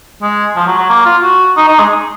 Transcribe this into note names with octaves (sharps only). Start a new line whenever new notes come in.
G#3
F3
F#3
F#3
A#3
F4
F#4
D#4
D#4
G#3